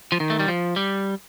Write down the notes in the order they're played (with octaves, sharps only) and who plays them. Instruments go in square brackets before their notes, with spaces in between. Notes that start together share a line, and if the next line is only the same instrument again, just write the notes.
[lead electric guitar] F3
D#3
A3
G3
F3
G3